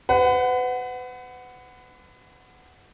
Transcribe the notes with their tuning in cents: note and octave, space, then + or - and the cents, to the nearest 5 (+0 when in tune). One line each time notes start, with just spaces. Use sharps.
B4 +35 F#5 +0